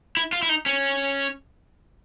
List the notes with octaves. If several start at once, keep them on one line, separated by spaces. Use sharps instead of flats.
E4
F4
E4
D#4
C#4